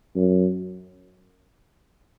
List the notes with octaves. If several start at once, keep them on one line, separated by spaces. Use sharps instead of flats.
F#2